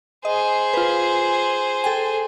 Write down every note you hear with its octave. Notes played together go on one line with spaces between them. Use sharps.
G#4 C5 D#5
F4 B4
A4 G5 G#5